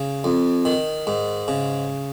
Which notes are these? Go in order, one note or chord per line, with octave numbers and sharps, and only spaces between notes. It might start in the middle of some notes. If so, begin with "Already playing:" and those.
Already playing: C#3
F2
D#3
G#2
C#3